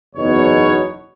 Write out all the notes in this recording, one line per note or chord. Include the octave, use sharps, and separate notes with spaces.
F#1 E2 B2 D#4 C#5